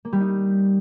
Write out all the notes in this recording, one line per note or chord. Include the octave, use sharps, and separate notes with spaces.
A#3
G3
D#4